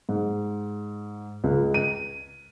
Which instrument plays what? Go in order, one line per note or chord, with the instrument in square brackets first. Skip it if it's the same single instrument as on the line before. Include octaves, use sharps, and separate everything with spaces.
[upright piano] G#2
C#2
D#7